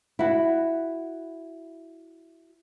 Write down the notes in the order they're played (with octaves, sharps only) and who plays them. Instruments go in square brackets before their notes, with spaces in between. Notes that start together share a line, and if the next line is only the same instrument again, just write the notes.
[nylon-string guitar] E4 F#4